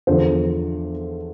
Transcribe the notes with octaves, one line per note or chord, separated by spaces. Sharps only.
E2 D3 F3 C5